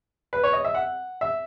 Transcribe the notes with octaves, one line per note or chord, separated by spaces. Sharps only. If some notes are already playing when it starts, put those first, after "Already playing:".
B4
C#5
D#5
E5
F#5
E5